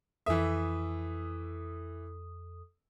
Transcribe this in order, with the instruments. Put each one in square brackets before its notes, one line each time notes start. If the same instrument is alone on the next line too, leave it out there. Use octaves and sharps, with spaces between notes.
[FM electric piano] F2 A4 D#6 [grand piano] E3 E5